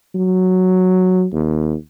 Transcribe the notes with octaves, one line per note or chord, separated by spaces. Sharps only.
F#3
D#2